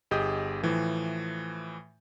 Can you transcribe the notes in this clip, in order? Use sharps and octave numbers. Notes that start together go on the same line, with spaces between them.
G1 G4 G#4 D#5 G6
A2 E3 F3